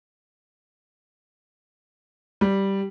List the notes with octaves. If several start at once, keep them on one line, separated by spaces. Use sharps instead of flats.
G3